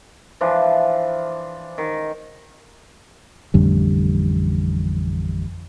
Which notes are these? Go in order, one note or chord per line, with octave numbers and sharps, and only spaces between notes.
E3 F3 D4
D#3
A1 F2 D3 G3